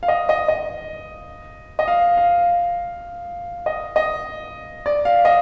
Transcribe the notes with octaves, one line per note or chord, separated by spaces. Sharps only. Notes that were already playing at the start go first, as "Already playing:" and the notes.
F5
D#5
D#5
D#5
D#5
F5
F5
D#5
D#5
D5
F5
D#5